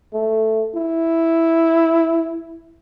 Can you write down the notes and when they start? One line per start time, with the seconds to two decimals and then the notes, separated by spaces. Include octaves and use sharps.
0.13 A3
0.75 E4